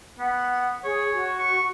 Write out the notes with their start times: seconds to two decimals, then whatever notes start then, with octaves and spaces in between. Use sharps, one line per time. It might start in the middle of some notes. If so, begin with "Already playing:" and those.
0.18 B3 F#5
0.84 G#4 C#5
1.13 F#4
1.39 C#6